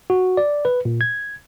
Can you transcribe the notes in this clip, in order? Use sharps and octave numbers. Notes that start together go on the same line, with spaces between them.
F#4
D5
B4
A#2
G#6